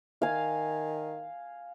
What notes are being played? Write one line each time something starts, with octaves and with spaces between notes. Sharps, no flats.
D#3 F5 G#5